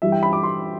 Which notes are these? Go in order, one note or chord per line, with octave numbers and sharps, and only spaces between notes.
G2 E3 G3 E5
G5
B5
D6
C6